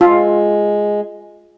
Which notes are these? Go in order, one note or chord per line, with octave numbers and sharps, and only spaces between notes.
G#3 F4